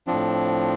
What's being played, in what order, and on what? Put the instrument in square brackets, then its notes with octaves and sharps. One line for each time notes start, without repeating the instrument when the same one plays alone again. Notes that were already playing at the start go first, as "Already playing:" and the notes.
[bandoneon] A2 F3 C4 D4